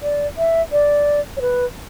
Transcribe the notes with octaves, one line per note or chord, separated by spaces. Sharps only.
D5
E5
D5
C#5
B4